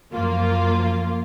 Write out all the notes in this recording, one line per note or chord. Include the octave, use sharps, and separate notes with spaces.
F#2 F3 A#3 F4